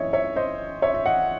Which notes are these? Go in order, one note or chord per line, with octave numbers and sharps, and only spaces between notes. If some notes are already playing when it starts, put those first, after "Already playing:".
Already playing: F#2 E3 A3 C4 D#4 C#5 D#5 E5
C#5 E5
C5 D#5
C#5 E5
E5
D#5 F#5